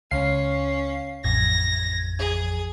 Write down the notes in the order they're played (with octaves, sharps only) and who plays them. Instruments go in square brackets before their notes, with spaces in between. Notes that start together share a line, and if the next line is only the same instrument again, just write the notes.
[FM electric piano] C#2 F5 C7 [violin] C#4
[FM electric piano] A1 F2 G#6 [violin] A#6
[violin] G#4